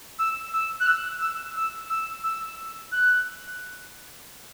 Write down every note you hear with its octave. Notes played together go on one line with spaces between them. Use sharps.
E6
E6
F#6
E6
E6
E6
E6
E6
F#6